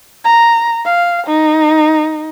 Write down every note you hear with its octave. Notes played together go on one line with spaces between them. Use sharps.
A#5
F5
D#4